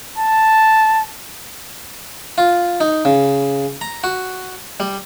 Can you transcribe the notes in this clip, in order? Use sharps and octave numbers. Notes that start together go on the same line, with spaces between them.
A5
F4
D#4
C#3
A#5
F#4
G3